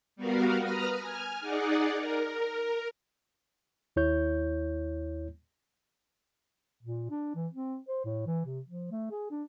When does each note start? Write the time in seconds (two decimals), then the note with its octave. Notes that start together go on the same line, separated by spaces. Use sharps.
0.16 G3 B3 F#4 A#4 F5
0.59 B4 A#5 D#6 F6
0.99 G#5 F6
1.40 D#4 G#4 D5 F#5
1.96 A#4
3.96 D#2 E4 C#5 G6
6.83 A#2
7.11 D4
7.35 E3
7.53 C4
7.88 C5
8.05 A2
8.27 E3
8.45 C3
8.68 F3
8.91 A3
9.11 G#4
9.31 D4